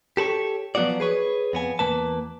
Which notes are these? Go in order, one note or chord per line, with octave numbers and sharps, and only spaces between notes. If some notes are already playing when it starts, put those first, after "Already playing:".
G4 A4 B4 C#5
F3 F#3 B3 F4 F#4 D5
G#4 B4 C#5
F2 B3 G#5
E2 E3 A#3 B4 A5